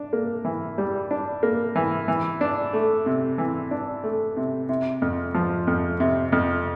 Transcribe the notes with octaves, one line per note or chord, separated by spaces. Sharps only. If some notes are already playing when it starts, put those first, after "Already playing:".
Already playing: D4
A#3
E3
G3
D4
A#3
E3
E3
D4
A3
C3
E3
D4
A3
C3
C3
F2
F3
F2
C3
F2